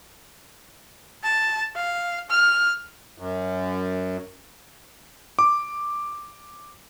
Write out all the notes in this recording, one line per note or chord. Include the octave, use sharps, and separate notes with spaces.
A5
F5
F6
F#2
D6